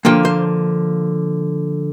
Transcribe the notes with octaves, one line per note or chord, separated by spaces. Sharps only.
D3 F3 A#3 G5
C5